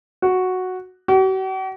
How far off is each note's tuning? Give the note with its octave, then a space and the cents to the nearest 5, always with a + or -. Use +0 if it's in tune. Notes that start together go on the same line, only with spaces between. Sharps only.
F#4 -5
F#4 +45